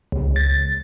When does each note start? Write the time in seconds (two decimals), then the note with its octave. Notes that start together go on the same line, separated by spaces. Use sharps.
0.12 C#2
0.36 A6